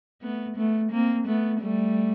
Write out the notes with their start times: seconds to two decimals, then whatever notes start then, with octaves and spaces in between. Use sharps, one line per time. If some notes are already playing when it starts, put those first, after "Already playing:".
0.22 A3 B3
0.56 A3 B3
0.91 A#3 C4
1.26 A3 B3
1.61 G3 A3